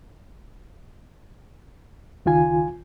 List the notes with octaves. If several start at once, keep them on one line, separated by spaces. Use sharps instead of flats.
C#2 D#3 F4 G#5